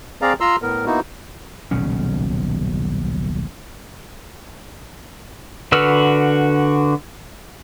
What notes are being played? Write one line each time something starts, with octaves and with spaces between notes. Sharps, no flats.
C4 G#4 D5 F5 A#5
F4 A#5 C6 E6
A2 B3 A#4
A#3 B3 D#4 E4 F#4
D#1 B1 C#3 C#4
D3 F#4 B4 E6 F6